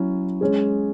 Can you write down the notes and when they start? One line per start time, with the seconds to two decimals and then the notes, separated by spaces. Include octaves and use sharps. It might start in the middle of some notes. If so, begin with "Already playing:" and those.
Already playing: F#3 C#4 E4
0.41 G#3 C#4 G#4